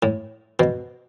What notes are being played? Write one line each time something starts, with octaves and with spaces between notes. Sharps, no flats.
A2
B2